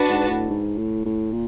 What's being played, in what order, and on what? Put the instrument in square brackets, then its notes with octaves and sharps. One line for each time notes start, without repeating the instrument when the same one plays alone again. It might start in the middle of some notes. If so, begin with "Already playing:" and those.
Already playing: [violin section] D4 F#4 B4 A5
[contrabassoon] G#2
A2
G#2
A2
A2
A#2